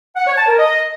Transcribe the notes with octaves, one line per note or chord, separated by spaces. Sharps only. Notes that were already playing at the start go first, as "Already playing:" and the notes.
F#5
C#5
A5
A#4
D#5